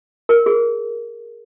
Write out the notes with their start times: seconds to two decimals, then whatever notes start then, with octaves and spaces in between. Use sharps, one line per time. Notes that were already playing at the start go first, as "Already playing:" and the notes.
0.29 A#4
0.46 G#4